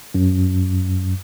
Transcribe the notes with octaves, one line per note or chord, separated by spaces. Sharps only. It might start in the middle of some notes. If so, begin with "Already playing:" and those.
F#2